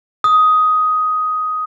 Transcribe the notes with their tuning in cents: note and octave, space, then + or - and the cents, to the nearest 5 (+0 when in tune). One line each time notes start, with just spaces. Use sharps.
D#6 +10